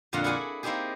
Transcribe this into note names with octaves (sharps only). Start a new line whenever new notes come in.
F2 A#2 D3 F4 F5 F#5
E4 G#4 A4 D5 F#5 G#5
A#3 C4 D#4 E4 G4 G#4